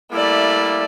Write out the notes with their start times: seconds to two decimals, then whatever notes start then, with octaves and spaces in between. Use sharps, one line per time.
0.12 G3 A3 A#3 E4 D5